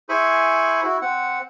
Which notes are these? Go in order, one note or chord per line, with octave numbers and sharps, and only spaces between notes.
E4 G#4 C5 G#5 B5 C#6
E4 F#4
C4 F#5